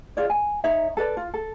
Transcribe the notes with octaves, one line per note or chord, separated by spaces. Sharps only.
F4 G#4 C#5 D5
G#5
D#4 C#5 E5
A4 B4 D5
F4
A4